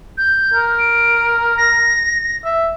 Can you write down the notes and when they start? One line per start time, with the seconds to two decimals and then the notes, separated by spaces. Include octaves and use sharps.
0.18 G6
0.54 A#4
0.79 D7
1.58 A#6
2.44 E5